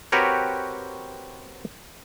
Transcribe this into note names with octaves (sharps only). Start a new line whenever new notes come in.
C4 F#4 G4 A#4 B4 C#5